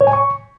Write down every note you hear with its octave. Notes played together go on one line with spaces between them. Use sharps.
C#5
G#5
C#6